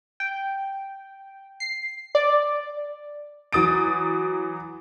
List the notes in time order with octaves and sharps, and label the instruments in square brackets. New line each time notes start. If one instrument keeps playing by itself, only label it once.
[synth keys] G5
C7
D5
[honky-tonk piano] E3 F#3 D#6 A6 D7